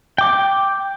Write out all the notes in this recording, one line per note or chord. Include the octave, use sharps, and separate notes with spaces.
G5 D6